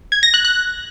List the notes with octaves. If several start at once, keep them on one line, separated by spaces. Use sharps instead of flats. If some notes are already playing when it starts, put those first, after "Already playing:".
G#6
A#6
F#6
F#6